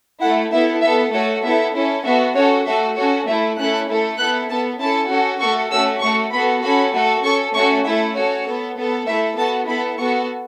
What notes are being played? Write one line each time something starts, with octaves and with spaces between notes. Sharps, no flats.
A3 E4 A4 F#5
B3 E4 A4 E5
B3 A4 E5
A3 F#4 A4 C#5
B3 E4 A4 E5
C#4 E4 A4
B3 F#4 A4 E5
C#4 F#4 A4 C#5
A3 F#4 A4 E5
C#4 F#4 A4 C#5
A3 E4 A4 E5
A3 C#4 E4 A4 F#6
A3 E4 A4
B3 E4 A4 F#6
B3 A4 A5
C#4 E4 A4 A5
C#4 F#4 A4
A3 F#4 A4 C#6
A3 C#4 F#4 A4 E6
A3 F#4 A4 C#6
B3 F#4 A4 B5
C#4 F#4 A4 B5
A3 F#4 A4
C#4 A4 C#6
A3 C#4 F#4 A4 C#6
A3 E4 A4 E5
C#4 F#4 A4 C#5
B3 A4
B3 A4
A3 E4 A4 E5
B3 F#4 A4 A5
B3 E4 A4 B5
B3 F#4 A4 C#6